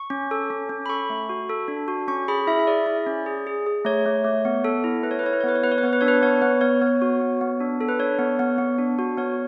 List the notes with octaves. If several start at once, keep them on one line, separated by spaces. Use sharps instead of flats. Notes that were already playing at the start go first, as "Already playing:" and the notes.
Already playing: C#6
C#4
A4
C#4
C#4
B5
A4 C#6
A3
F#4
A4
D4
F#4
C#4 C#6
G#4 B5
E4 E5
E5
G#4 D5
E4
C#4
G#4
G#4
G#4
A3 C#5
A3
A3
B3
A4
E4
E4 B4
C#5
B4
E4 C#5
B4
C#5
B3 B4
C#5
B3 B4
C#5
B4
B3 C#5
B4
D4 C#5
B4
B3 C#5
B3 B4
B3 C#5
B3 C#5
F#4
B3
B3
D4
A4
B4
D4 C#5
B3
B3
B3
D4
F#4
B3 C#5